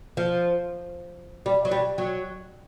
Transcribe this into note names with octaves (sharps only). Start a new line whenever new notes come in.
F3
G3
F#3
G3
F#3